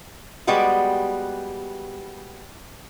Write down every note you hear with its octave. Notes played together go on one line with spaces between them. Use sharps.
G3 G#3 B3 F#4 G4